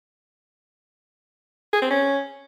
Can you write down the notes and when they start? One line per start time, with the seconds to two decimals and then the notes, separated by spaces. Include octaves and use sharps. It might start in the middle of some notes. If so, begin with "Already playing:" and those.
1.73 G#4
1.82 C4
1.90 C#4